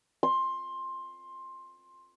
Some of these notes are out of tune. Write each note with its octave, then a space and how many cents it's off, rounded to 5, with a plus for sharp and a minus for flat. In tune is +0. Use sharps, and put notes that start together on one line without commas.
C6 +15